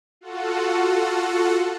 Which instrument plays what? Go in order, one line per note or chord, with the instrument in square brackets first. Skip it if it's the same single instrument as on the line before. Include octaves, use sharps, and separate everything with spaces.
[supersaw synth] F4 F#4 A4 F#5